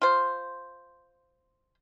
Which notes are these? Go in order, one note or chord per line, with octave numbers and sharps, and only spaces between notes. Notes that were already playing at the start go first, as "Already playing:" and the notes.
F4 C5